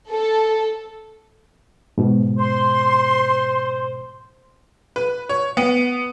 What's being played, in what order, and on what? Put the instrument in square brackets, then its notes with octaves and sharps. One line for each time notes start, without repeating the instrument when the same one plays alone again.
[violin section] A4
[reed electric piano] G#2 B2
[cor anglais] C5 [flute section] C6
[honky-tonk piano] B4
C#5
B3